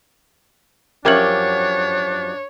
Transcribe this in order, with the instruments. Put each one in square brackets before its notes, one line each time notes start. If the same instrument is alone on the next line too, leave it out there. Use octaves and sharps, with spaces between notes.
[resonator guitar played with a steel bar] F#2 F3 G4 [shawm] D4 [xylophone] A#4 G#6 F#7 [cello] C#5